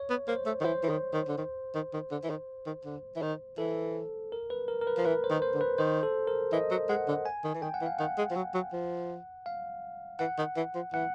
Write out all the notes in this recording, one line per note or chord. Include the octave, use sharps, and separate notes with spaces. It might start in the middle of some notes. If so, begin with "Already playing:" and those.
Already playing: C#5
B3
A#3 C5
A3
D#3
E3 C5
E3
D#3
D#3
D3
D#3
D#3
D#3
D3
E3
D#3
D#3
D3
E3
D#3
E3 A4
A#4
B4
A#4
A#4
B4
F3 A#4
E3 B4
C5
D#3
C5
D3
B4
D#3 C5
A4
A#4
E3 D#5
F#3
G#3 F#5
D3
G#5
D#3
E3
D#3 G5
F#5
E3
F5
D#3 F#5
G#3
F3
F#3
F#3
F3
F5
E3 F#5
D#3
E3
F3
E3 F#5